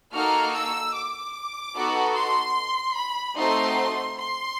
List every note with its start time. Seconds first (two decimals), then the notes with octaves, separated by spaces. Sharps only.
0.13 A#3 D#4 F#4 A4 F6
0.54 E6
0.95 D6
1.75 B3 D#4 F#4 A4
2.15 C6
2.96 B5
3.37 A3 C4 D#4 F#4 A4 C6
4.17 C6